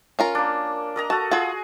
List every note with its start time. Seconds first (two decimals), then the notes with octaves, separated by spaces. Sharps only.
0.19 C#4 F4 A#4
0.35 A#3 D4
0.96 A#4 D#5 A#5
1.10 F#4 A4 A5
1.31 F4 F#4 G#4